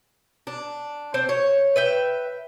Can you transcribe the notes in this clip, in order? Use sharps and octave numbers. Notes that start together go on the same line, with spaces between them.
D4
C4
C#5
B4 E5 G5